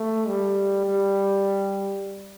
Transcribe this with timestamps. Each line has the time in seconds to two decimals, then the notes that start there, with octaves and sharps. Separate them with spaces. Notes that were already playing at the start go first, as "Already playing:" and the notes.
Already playing: A3
0.27 G3
0.86 G3